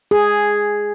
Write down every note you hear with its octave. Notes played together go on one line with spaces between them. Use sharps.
G#4